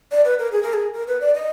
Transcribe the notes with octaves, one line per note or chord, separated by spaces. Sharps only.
D5
B4
A#4
G#4
A#4
G#4
A#4
B4
D5
D#5